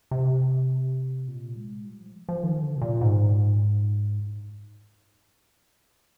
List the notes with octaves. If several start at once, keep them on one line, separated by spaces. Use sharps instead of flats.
C3
A#2
G#3
G3
F3
F3
D#3
D3
C3
A#2
G#2